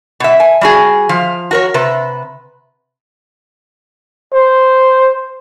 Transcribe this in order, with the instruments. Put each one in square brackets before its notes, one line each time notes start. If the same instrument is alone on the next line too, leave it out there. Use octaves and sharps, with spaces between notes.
[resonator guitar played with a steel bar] B2 E5
G#5
G3 F#4 G#4
F3 F5
F#4 A#4 C#5
C3 B4
[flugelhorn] C5